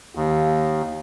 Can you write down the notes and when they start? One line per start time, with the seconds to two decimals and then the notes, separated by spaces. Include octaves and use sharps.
0.15 D#2